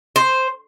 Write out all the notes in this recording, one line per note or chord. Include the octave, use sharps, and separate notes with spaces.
C5